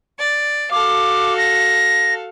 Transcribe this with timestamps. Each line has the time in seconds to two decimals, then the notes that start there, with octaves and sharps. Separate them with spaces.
0.19 D5
0.71 F#4 A4 F5 D6
1.37 A#6